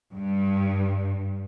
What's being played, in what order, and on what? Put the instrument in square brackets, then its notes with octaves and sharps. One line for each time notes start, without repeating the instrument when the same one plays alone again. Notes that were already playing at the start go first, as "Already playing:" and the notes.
[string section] G2